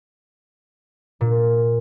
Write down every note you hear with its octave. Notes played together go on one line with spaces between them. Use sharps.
A#2